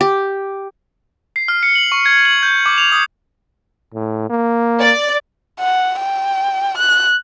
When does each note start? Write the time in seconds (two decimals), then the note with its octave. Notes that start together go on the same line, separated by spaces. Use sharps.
0.01 G4
1.36 C7
1.48 F6
1.63 C#7
1.75 F#7
1.92 C#6
2.06 G#6
2.25 F#7
2.43 G6
2.66 D6
2.78 F7
2.92 D#6
3.94 A2
4.30 A#3
4.80 D5
5.60 F#5
6.00 G5
6.78 F#6